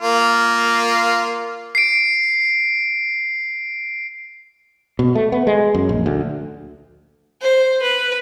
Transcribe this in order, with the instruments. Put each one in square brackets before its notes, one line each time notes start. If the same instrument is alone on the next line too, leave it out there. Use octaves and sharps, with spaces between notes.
[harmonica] A#3 F4
[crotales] C7 D7
[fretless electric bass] B2
A3
B3
G#3
F#2
A#1
D2
[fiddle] C5
B4